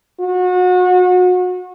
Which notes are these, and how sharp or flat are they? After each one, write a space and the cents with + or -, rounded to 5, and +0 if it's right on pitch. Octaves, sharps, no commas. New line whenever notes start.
F#4 -30